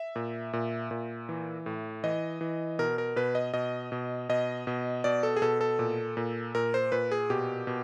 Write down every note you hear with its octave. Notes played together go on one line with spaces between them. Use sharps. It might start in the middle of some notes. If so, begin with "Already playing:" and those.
Already playing: E5
A#2
A#2
A#2
E3
A2
E3 D#5
E3
B2 A#4
A#4
B2 B4
D#5
B2 D#5
B2
B2 D#5
B2
B2 D5
A4
G#4
B2 A4
A4
A#2
A#2
A#2 A#4
C5
A#2 B4
G#4
B2 G4
B2